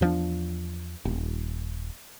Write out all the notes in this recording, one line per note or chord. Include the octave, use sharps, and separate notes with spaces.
E2 F3 B3 D4
D#1